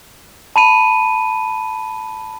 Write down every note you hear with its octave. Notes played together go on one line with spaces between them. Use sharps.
A5 B5 D#7